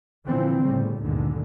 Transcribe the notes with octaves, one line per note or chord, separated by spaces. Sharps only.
A#2 D3 E3 F3 C4
G1 A2 C#3 G3
D2 G2 A#2 D3 D#3 G#3